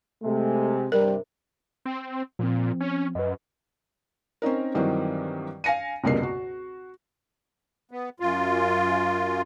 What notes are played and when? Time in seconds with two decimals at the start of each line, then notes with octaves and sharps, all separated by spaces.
0.23 C3 G#3 A3
0.92 G2 C3 G3 A#4
1.85 C4
2.39 A#2 F3 C4
2.80 C#4
3.15 F#2 B4 D#5
4.42 C4 C#4 D#4 A#4
4.75 G2 D#3 E3 F#3 C4
5.64 F5 G#5 A#6 C#7 D#7
6.04 F1 C#2 G2 B2 A#3 C7
6.23 F#4
7.91 B3
8.20 F#2 F4